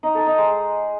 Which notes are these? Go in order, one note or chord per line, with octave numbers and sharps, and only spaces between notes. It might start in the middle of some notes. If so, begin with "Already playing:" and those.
D#4
A4
D#4
G#3